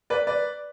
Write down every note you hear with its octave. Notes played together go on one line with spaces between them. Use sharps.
B4 D5
B4 D5